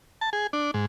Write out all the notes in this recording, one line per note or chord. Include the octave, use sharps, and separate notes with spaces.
A5
G#4
D4
G#2